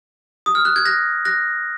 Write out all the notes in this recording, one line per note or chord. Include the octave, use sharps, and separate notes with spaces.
D#6
F6
F#6
G#6
F#6 A#6
F#6 A#6